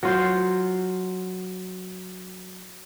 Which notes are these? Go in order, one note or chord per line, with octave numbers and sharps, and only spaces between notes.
F#3 F4 C5